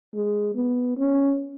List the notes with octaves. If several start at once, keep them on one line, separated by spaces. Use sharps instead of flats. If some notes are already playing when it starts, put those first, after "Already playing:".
G#3
B3
C#4